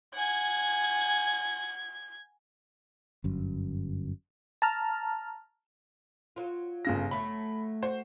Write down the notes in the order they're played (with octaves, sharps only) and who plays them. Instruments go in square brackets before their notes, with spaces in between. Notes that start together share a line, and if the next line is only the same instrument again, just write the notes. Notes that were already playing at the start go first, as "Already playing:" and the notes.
[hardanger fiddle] F#5 G#5 [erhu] G#6
[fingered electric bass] G1 F#2
[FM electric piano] A5 A#5 F6
[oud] F#3 F4
[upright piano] G1 C#3 A#6
[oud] F#3 A3 [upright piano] B5
[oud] F#4 [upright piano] C5